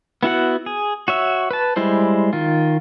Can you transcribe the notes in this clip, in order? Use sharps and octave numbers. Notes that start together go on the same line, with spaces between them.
B3 E4 F#4 F#5
G#4
F#4 C#5 E5
B4 A5
G3 G#3 E4 C5
D#3 F4